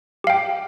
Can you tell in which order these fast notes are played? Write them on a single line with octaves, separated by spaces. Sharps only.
G4 F5 G5